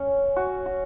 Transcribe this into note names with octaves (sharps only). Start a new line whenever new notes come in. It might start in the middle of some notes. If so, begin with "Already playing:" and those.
Already playing: C#4
F#4
F#4